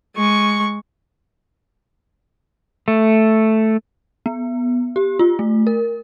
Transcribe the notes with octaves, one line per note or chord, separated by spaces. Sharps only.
G#3 C#6
A3
B3
G4
F4
A3
A#4